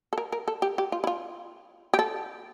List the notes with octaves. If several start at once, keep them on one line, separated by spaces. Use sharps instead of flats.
A4
A#4
A#4
A4
G4
G4
F4
E4
F4
G4
A4